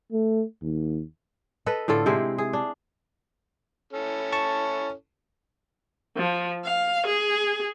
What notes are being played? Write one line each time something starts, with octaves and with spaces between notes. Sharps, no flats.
A3
D#2
A4 B4 D#5
A2 D3 F4 A4
C3 G#3 C4 E4
G#4
D4
C#4 E4 A4
A5 C#6
F3
F5
G#4